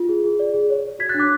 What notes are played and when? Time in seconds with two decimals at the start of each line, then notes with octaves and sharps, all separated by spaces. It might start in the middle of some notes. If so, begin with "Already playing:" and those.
Already playing: F4
0.09 G#4
0.24 G#4
0.39 D5
0.54 G#4
0.70 C#5
0.85 C#5
0.99 F#4 G#6 B6
1.09 F#6 A6
1.14 D4
1.20 D6 F#6